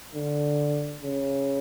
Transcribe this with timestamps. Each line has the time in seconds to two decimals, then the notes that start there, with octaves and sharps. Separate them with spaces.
0.14 D3
1.03 C#3